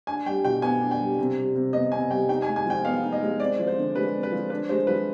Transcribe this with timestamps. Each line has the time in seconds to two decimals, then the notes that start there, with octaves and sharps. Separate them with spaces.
0.07 D4 G#5
0.26 G3 G5
0.45 B2 G5
0.62 B3 G#5
0.81 D4
0.91 G5
1.00 G3
1.19 C3
1.37 G3
1.55 C3
1.73 B3 D#5
1.92 C3 G#5
2.10 G3 G5
2.28 D#4 G5
2.42 G#5
2.47 G#3
2.56 G#5
2.66 F3 G5
2.85 B3 F5
3.03 D#4
3.12 D#5
3.21 G#3
3.39 C4 D5
3.59 F3
3.67 C5
3.77 D3
3.95 G#3 B4
4.13 C4
4.23 B4
4.32 F3
4.50 D4 B4
4.69 G#3 C5
4.87 F3 B4